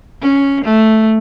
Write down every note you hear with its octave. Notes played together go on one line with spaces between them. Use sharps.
C#4
A3